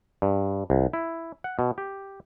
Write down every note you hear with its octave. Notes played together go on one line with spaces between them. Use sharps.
G2
C2
E4
F#5
B2
G4